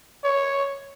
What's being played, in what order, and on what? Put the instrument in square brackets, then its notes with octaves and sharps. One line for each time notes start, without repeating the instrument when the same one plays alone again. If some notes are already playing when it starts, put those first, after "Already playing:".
[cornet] C#5